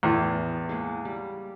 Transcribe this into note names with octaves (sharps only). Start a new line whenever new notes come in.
E2 A2 E3 G#4
G#3 A#3 F#5
G3